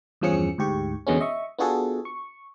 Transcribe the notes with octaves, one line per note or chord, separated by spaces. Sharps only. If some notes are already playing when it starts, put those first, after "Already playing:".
E2 G2 F3 C#4 G#4 C#7
D2 G#2 G4 C#6
E2 B2 D3 G#3 B3 C#4
D#5 E5 C#6
B3 D4 F4 F#4 G#4 A4
C#6